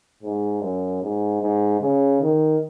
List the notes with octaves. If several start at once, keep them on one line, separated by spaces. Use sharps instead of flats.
G#2
F#2
G#2
G#2
C#3
D#3